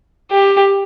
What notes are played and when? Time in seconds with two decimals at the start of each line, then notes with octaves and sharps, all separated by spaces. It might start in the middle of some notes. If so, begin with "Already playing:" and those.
0.31 G4